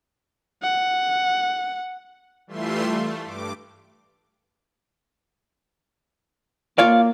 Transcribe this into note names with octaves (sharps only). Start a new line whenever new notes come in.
F#5
E3 G3 A3 F4 E5 C6
A3
G2 D6
A#3 F4 C#5 D5 F5